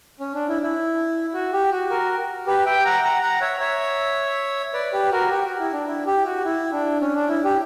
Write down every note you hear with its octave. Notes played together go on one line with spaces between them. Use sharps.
C#4
D4
E4
E4
F#4
G4
F#4
F#4 A#4
G4 B4
E5 G5
F#5 A#5
F#5 A#5
F#5 A#5
C#5 E5
C#5 E5
B4 D5
G4 B4
F#4 A#4
G4
F#4
E4
D4
E4
G4
F#4
E4
D4
C#4
D4
E4
G4